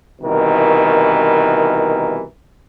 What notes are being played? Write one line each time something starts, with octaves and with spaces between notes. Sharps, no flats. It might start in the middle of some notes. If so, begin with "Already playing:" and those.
C2 B2 D#3 E3 A#4